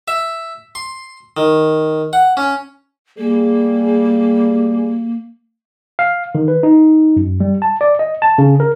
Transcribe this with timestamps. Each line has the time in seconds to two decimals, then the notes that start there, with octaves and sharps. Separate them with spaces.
0.08 E5
0.75 C6
1.37 D#3
2.13 F#5
2.37 C#4
3.18 G3 A#3 G#4
5.99 F5
6.35 D#3
6.48 B4
6.63 D#4
7.16 F#2
7.40 G3
7.62 A5
7.81 D5
7.99 D#5
8.22 A5
8.38 C#3
8.60 A#4